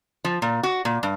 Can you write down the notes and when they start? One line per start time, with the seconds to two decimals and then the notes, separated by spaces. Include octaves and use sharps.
0.25 F3
0.42 A#2
0.63 F#4
0.85 A#2
1.03 G2